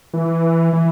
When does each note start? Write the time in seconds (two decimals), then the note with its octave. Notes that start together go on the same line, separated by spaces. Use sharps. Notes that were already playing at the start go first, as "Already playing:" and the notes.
0.14 E3
0.73 E3